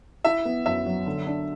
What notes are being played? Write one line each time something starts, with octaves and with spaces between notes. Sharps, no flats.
E4 E5
B3
F#2 E5
F#3
D3
D4